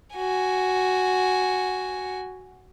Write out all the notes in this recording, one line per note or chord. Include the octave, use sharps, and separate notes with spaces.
F#4 G#5